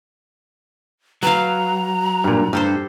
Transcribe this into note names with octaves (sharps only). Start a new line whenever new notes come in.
F#3 B4 F5 A#5
G2 A#2
G2 G4 A4 C5